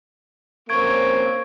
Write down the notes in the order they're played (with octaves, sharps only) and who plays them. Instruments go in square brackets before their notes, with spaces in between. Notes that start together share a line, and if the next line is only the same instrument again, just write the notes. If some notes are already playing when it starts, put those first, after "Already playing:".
[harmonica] A#3 C4 C#4 [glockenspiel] C#6 G#6 D7